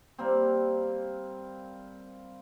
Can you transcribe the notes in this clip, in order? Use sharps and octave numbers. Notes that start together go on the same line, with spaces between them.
G3 A#3 C4